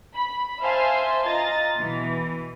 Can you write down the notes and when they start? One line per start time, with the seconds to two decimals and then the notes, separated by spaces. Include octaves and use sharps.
0.15 B5
0.62 C5 E5 F5 G#5 A5 C6
1.26 F4 D#5 A#5 A6
1.79 B2 E3